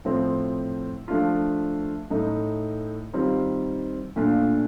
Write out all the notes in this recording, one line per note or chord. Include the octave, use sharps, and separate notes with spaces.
A2 F3 C4
F3 A3 D4 F4
A2 A3 D#4
D#3 G3 C4 F4
A#2 A3 D4 F4